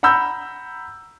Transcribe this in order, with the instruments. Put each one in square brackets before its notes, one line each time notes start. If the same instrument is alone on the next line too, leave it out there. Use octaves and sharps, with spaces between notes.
[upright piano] F#5 A#5 B5 E6 G6